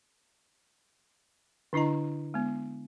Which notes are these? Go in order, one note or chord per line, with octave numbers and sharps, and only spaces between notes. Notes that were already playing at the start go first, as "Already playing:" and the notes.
D3 D4 E4 D#5 A#5
G#3 B3